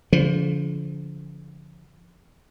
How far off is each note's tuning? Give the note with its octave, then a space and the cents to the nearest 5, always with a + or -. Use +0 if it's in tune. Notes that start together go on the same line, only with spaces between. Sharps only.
D3 -45 F3 -15